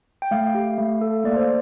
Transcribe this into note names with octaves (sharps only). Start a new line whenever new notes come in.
G5
A3 F5
G4
A3
A4
A#3 D5
C5